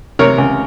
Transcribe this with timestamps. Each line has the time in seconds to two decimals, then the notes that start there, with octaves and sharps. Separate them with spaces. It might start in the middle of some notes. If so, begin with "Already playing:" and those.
0.19 C3 A#4 C#5
0.38 C#2